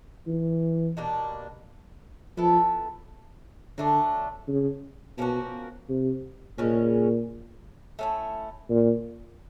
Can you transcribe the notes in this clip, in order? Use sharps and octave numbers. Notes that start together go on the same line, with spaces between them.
E3
B2 G3 A#3 D4
F3 B3 E4 A4
D3 F#3 A3 D4
C#3
B2 F3 A#3 C#4 F#4
C3
A#2 C#3 F3 G#3 C#4
A3 C#4 E4
A#2